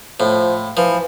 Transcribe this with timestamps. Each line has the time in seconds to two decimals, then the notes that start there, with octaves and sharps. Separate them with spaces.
0.20 A2 F3
0.77 E3 F3